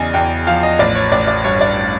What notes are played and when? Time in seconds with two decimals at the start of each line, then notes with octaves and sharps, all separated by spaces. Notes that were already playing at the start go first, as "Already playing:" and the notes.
Already playing: E2 C#3 D5 D#5 G#5
0.14 E2 G5
0.47 F3 F5
0.63 D#5
0.79 A1 D5
0.95 C#5
1.12 A1 D5
1.27 D5
1.44 G2 C#5
1.61 D5